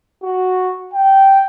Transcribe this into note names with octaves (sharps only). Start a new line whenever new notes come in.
F#4
G5